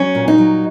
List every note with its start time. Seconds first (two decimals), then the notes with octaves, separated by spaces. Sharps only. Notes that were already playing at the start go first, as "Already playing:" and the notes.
Already playing: F#3 C#4
0.15 A#2
0.28 D#4
0.38 F#3